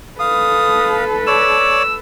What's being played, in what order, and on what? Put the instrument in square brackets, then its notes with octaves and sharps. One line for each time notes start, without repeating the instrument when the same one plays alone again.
[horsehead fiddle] A4 B4 [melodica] F5 [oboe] D#6
[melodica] C#5 D5 [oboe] E6